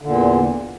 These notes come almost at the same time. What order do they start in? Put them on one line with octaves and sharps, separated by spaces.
D3 A#2 E2